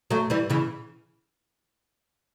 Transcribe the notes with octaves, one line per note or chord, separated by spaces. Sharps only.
F#3 A3
E3 G3
C#3 E3